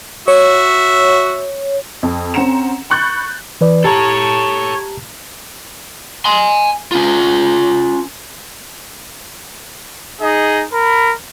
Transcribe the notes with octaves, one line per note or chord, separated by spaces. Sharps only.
F#4 C#5 E5
F2
C4 C#4 F#5 A#5 C#7 E7
B5 C#6 F#6 G6 A6
E3 B4 D5
G4 A4 C#5 A5 A#5
G#5 C6
C#4 F4
D#4 G#4 D#5
A#4 B5